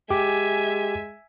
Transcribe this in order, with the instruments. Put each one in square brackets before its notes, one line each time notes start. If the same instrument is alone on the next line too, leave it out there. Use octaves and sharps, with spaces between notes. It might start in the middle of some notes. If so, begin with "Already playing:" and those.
[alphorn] G#3 [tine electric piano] G4 [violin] E5 G#5